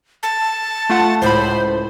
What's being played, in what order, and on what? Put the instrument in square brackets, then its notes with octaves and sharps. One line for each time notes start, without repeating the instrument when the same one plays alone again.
[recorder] A5
[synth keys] A3 F4 F#5
[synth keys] C#2 A2 B5 [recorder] C5